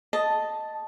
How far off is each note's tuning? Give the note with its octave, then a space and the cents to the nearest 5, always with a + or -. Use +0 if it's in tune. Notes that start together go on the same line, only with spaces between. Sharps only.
D#5 +0 A5 +0